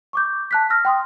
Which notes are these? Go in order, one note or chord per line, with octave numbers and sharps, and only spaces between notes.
C#6 D6 G6
A5 F#6 B6
E6 F6 A#6
G5 C6 D#6